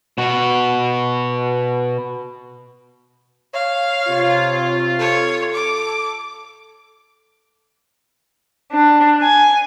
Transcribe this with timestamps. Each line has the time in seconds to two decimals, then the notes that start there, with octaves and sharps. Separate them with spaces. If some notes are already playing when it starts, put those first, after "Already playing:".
0.18 B2 F#4
3.54 C#5 F5
4.08 C3 F4
4.99 A4 C#5
5.54 D6
8.72 D4
9.22 G#5